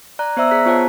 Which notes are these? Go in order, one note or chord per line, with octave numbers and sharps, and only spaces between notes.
D5 A#5 F#6
B3 C5 D5 E5 A#5 E6
G#4 A#5 F#6 B6
B3 F4 C5 C#5 F#5 A5